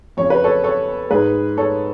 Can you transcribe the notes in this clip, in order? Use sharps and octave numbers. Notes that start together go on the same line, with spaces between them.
F2 C#3 C#5
B4
A4 C#5
A4 C#5
G#2 G#4 B4
A4 C#5